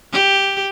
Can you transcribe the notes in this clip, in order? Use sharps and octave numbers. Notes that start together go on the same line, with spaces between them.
G4